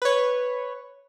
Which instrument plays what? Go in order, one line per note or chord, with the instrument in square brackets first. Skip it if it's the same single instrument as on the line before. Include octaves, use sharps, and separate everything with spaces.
[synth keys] B4 C#5